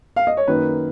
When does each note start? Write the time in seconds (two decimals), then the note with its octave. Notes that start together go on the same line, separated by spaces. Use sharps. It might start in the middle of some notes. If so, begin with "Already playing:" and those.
0.16 F5
0.27 D#5
0.37 C#5
0.47 F#2 D#3 F#3 A#3 D#4 B4